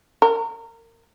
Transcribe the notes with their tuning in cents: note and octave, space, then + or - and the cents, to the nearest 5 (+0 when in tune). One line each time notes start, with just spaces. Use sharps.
A#4 -25